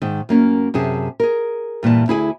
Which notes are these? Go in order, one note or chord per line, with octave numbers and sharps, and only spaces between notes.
G#2 D#3
F#2 A#3 C#4
F#2 C3 G#4 A5
G#4 A#4
G2 A#2 E3 A5
D2 E4 G#4 G#5